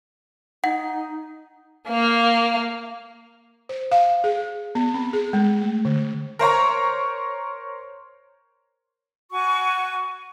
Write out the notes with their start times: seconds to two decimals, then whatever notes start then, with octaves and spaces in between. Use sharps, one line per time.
0.64 D#4 F#5
1.88 A#3 F5
3.69 C5
3.92 F5
4.24 G#4
4.75 B3
4.94 C4
5.13 G#4
5.33 G#3
5.62 A3
5.85 D3
6.39 A#4 C5 C#5 A#5
9.32 F#4 G#5 C#6